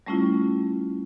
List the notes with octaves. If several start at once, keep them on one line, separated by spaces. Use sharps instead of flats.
G3 A3 C#4 E4 F4